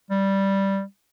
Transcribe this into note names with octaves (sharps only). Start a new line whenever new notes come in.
G3